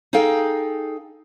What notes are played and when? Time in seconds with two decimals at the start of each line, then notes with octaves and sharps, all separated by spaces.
0.13 D#4 G#4 A4 F5 G5